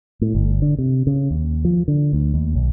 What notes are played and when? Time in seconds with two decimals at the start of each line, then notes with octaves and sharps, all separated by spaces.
0.21 A2
0.35 G1
0.62 D3
0.78 C3
1.07 C#3
1.30 D#2
1.65 F3
1.88 D3
2.13 D2
2.34 D#2
2.55 B1